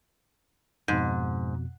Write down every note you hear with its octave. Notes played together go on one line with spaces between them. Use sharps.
F2 G#2 B2